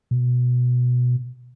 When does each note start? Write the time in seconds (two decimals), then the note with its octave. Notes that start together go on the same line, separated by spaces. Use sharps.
0.11 B2